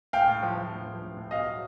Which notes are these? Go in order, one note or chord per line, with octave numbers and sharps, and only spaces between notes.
A2 F5 G5
A2
F3
F3
A2
F3
A2
A2
B2 D#5 F5
F#3